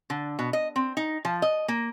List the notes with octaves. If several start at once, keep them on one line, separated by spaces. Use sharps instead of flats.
D3
B2
D#5
C4
D#4
F3
D#5
A#3